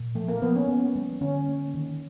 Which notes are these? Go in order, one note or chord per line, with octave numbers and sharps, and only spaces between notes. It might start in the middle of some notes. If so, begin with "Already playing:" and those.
Already playing: A#2
F3 A3
A#3
F3 B3
C#4
B3
G3
D3 C#4
A#3
D#3